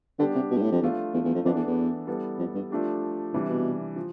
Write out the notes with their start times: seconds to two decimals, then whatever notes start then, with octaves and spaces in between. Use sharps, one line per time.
0.19 D3 G3 B3 D4 G4
0.35 C3
0.51 B2
0.57 G2
0.62 A2
0.72 F2
0.82 E2 F3 A3 D4 F4
1.14 E2
1.24 E2
1.34 F2
1.45 F2 E3 B3 D4 A4
1.56 E2
1.67 E2
2.07 G3 B3 E4 A4
2.39 F2
2.55 G2
2.70 F3 A3 D4 G4
3.34 A2 C3 E3 G3 D4
3.49 B2
3.96 F3